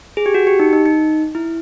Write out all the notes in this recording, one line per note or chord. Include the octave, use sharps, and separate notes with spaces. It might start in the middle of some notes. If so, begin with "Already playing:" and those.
G#4
G4
F#4
G4
D#4
D#4
D#4
E4